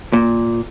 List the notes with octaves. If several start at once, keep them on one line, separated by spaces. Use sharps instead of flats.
A#2